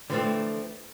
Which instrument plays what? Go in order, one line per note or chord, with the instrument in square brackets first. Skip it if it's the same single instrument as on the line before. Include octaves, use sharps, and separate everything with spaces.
[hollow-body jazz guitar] D3 E3 F3 G#3 A3 C4